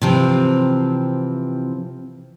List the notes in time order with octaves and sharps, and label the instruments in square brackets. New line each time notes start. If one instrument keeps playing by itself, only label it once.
[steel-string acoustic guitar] C3 E3 F3 C4